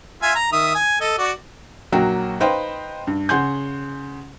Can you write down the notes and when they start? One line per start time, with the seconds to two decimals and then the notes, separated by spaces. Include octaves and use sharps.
0.22 F4 E5 G#5
0.35 A#5
0.52 D#3 E5 D#6
0.75 G#5
1.01 A4 D#5
1.18 F#4 D5
1.92 A#1 F#3 A#3 F#4 G5
2.40 D#4 B4 C5 D#5 F5 G5
3.07 G2
3.29 C#3 F#5 G#5 C6 G6